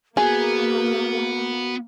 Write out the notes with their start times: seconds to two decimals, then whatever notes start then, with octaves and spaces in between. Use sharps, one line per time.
0.17 A#3 B3 F#4 G#4